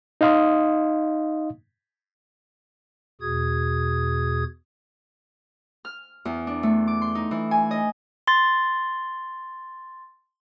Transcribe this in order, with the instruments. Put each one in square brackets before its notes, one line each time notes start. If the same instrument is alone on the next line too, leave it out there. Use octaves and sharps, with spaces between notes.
[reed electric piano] D#4 D#5 F5 C6 D#6
[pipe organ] E2 B2 F#4 G#4 D#6 G#6
[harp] F6
E2
D4
A3
D6
C6
D#4
E3
G#5
D#5
[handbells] C6 A6